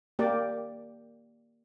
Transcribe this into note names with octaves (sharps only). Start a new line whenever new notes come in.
A#3 G4 D5